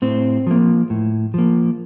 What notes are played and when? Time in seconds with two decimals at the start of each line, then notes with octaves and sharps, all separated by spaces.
0.02 A2 C4
0.47 F3 A#3
0.90 A2
1.34 F3 A#3